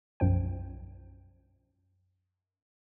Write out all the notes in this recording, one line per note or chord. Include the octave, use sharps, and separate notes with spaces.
B1 F#2 F3 G5